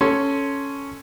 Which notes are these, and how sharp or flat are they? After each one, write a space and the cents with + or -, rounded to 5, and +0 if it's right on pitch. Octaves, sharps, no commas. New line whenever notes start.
C#4 +0 A4 +0 C6 +0